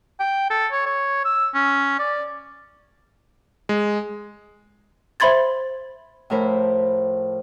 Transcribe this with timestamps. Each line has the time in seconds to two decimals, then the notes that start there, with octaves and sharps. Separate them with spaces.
0.20 G5
0.51 A4
0.72 C#5
0.86 C#5
1.25 E6
1.54 C#4
1.99 D5
3.69 G#3
5.20 C5 E5 B5 C6 G#6 A6
6.30 A2 F3 A#4 C5 B5